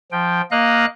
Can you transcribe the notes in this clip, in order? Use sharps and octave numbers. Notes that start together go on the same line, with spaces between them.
F3 G5
A#3 D#5 F5 F#6